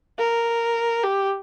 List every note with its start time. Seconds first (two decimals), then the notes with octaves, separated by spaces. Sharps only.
0.19 A#4
1.04 G4